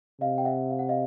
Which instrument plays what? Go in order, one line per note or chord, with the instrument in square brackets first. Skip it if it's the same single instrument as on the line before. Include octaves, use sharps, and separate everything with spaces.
[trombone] C3 [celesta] D#5 F5
[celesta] G5
E5 F#5
F5
F#5
D#5 F5